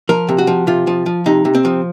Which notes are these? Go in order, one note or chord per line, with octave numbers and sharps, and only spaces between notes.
F3 A#4
C3
F#4
F3
C3 F4
F3
F3
C3 D#4
C3
C4
F3